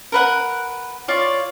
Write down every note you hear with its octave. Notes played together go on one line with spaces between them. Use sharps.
A#4 B4 F#5
F4 C#5 D5